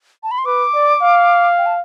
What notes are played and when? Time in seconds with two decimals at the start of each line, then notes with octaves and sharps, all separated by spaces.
0.23 A5
0.31 B5
0.38 C6
0.46 B4 D6
0.74 D5
1.02 F5
1.58 G5
1.66 A5